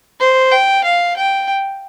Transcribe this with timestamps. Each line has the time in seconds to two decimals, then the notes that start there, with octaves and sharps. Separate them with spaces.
0.20 C5
0.51 G5
0.84 F5
1.16 G5